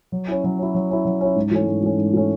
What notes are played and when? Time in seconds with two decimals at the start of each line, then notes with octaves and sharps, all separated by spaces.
0.12 F#3
0.28 C#4 E4
0.44 F#3
0.59 C#4 E4
0.74 F#3
0.90 C#4 E4
1.05 F#3
1.21 C#4 E4
1.36 G#2
1.51 E3 A3 C#4
1.67 G#2
1.82 E3 A3 C#4
1.98 G#2
2.14 E3 A3 C#4